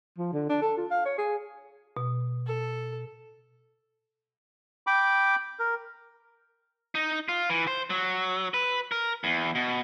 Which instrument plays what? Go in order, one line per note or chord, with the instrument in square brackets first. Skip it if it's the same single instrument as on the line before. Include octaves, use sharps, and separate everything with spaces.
[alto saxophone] F3
D3
D4
A4
F4
F5
C#5
G#4
[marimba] B2
[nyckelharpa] A4
[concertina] G5 B5 D6
A#4
[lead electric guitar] D#4
F4
E3
C5
F#3
B4
A#4
E2
B2